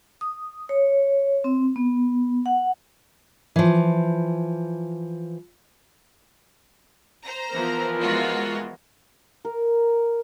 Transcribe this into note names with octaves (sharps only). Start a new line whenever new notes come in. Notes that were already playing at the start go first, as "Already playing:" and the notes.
D#6
C#5
C4
B3
F#5
E3 F3
C5 A#5
E3 F3 B3 A#4
G#3 F4 F#4
A#4